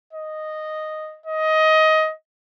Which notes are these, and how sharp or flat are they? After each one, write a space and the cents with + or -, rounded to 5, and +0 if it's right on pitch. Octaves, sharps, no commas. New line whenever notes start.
D#5 -5
D#5 +15